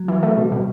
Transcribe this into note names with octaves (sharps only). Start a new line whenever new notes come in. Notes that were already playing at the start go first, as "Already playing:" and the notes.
Already playing: F#3
E3
A3
B2 G3
B2